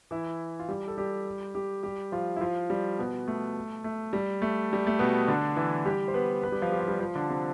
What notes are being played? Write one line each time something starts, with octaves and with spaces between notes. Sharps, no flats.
E3 E4
F4
G3 G4
A4
G3 G4
G3 G4
G3 G4
F3 F4
E4
F3 F4
G3
B2 B3
A3
A3
G3
A3
G3
A3
B2 B3
D3 D4
E3 E4
G3 G4
C5
B3 B4
B3 B4
G3 G4
F3 F4
G4
F4
G3 G4
F3 F4
D3 D4
C3 C4